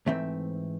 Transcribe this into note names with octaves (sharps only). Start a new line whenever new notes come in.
G#2 E3 A3 C4 E5